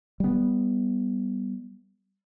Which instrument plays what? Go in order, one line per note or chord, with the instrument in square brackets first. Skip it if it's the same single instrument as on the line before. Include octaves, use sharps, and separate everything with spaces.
[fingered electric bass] G3 B3